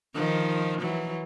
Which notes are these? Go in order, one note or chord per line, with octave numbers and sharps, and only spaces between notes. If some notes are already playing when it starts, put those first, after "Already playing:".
D#3 F3
E3 F#3